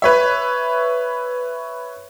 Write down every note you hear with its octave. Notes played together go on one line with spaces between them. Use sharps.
B4 C#5 E5